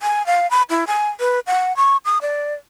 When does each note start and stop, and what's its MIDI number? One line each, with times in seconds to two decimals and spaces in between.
0.02 0.25 80
0.26 0.49 77
0.51 0.62 83
0.70 0.84 64
0.87 1.09 80
1.20 1.40 71
1.47 1.75 78
1.77 1.97 85
2.05 2.18 87
2.22 2.54 74